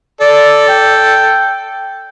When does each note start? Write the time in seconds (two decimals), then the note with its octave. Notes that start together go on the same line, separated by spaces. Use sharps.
0.21 A4 D5
0.68 G5